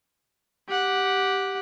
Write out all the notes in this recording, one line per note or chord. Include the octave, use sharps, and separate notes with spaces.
G4 F#5